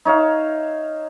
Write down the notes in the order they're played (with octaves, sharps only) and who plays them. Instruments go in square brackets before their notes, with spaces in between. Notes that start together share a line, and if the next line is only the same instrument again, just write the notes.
[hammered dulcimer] D#4 C#5 E5 F5